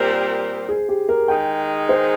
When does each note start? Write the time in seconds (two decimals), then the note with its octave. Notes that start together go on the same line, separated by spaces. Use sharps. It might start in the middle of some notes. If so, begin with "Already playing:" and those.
Already playing: A#2 G3 C4 G4 A#4 C5
0.69 G#4
0.89 G4
1.09 A#4
1.28 D#3 G#3 D#4 G#4 G5
1.89 C5